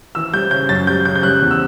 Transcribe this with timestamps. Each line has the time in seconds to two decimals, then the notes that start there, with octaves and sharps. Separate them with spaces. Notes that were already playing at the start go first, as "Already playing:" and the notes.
0.15 E3 E6
0.33 G3 G6
0.51 C#3 G6
0.69 F#2 A6
0.87 G3 G6
1.05 C#3 G6
1.16 G6
1.23 G3 F#6
1.42 E2
1.51 E6